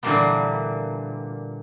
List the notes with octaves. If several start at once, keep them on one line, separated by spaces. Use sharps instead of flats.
A#2 D3 E3 G3 A#3 B3